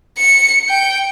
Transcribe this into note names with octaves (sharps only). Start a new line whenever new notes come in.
C#7
G5